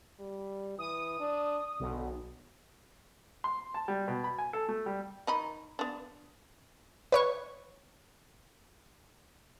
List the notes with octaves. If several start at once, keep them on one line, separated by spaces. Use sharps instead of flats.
G3
E3 D#6
D4
B1 D3
C6
A5
G3
B2
B5
G#5
A4
A3
G3
D#3 D#4 B5
B3 D4
B4 C#5 C#6